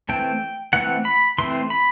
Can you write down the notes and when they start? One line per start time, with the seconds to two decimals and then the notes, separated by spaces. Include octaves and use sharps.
0.09 E3 A3 C4 G5
0.73 E3 A3 C4 F#5
1.05 B5
1.38 E3 A3 C4 C6
1.70 B5